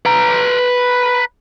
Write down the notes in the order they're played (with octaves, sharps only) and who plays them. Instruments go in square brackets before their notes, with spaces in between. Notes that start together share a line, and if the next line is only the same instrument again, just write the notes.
[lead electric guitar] B4 A#5